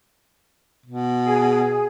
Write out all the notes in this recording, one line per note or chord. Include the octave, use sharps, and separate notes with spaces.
B2
G#4